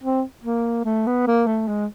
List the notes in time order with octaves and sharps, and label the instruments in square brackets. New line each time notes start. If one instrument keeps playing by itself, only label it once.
[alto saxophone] C4
A#3
A3
B3
A#3
A3
G#3